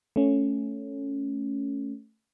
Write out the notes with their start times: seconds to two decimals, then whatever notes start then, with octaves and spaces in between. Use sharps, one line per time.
0.16 A3 C#4